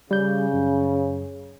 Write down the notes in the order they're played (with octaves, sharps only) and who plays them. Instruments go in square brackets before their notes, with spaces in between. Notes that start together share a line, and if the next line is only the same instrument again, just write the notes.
[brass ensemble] C#3 [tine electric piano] G3 G6
[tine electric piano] F#2